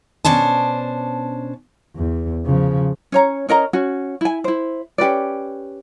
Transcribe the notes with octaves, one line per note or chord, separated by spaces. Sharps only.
B2 C#4 D4 C5 A5
E2
C#3 F3
C#4 C#5 A#5
C#4 A#4 D#5 A#5
C#4 F#4
E4 G#5
E4 C5
C#4 G4 B4 D5